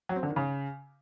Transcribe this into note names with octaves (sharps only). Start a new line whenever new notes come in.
F#3
C4
D3
D#3
C#3